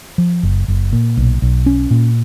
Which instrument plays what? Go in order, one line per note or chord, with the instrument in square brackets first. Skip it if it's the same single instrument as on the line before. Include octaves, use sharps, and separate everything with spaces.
[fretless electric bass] F3
F#1
F#1
A#2
B1
B1
C#4
A#2